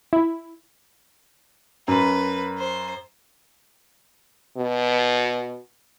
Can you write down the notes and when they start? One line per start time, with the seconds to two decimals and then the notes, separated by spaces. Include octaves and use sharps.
0.13 E4
1.88 F#2 B4
2.58 C5
4.57 B2